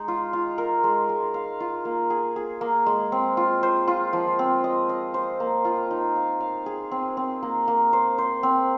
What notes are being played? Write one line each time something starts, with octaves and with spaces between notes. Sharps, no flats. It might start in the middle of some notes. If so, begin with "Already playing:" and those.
Already playing: G#3 D#4
F4
F4
A#4
G#3
G#3
F5
F4
A#3
G#4
G#4
A#3
G#3
C4
F4
C5
F4
F3
C4
D#5
D#5
C5
A#3
F4
D#4
F5
F5
G#4
C4
C4
A#3
A#3
C5
C5
C4